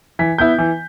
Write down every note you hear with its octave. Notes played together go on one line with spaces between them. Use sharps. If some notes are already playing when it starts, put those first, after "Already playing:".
E3 B6
B3 E4 G6
E3